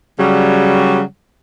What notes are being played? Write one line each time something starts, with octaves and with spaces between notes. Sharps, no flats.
C#3 F#3 G3